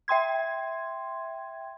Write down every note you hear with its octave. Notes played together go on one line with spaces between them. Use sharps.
E5 G5 C6 G#6